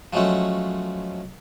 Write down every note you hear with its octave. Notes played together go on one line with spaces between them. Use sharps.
F3 F#3 G#3 A3 C#4